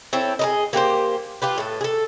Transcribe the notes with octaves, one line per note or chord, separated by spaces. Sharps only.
C4 E4 A4 C#5
G#4 A#4 D#5
A#3 G4 B4 C5
F4 G4 B4
A2 A4
G#4 A4